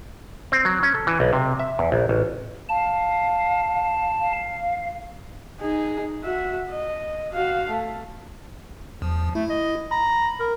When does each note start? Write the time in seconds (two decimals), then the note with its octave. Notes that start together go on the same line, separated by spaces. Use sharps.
0.52 C4
0.65 F#3
0.83 C#4
0.94 A4
1.07 E3
1.20 B1
1.33 C3
1.59 E5
1.79 E2
1.92 A#1
2.09 A1
2.69 F5 A5
4.20 F5
5.60 D#4 G#4
6.23 F#4 E5
6.71 D#5
7.33 F#4 F5
7.69 A3
9.02 E2 F3
9.35 A3 E4
9.50 D#5
9.91 A#5 B5
10.39 A#4